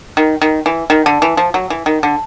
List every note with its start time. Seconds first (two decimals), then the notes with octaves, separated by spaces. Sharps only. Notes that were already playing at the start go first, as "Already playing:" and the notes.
0.17 D#3
0.42 D#3
0.66 E3
0.90 D#3
1.06 D3
1.22 E3
1.37 F3
1.54 F#3
1.70 E3
1.86 D#3
2.03 D3